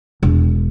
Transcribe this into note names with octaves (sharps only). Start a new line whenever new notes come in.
E1